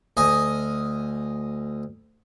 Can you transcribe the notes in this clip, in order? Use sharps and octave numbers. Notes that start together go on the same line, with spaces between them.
D2 D#5 G#5 D#6